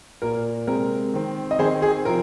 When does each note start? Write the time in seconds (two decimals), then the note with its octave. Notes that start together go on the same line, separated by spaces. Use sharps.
0.22 A#2 A#3 A#4
0.67 C3 G#3 C4 A#4
1.14 D#3 C4
1.51 D#5
1.59 D#3 C4 G#4 C5
1.82 G#4
2.05 C3 F3 C4 A#4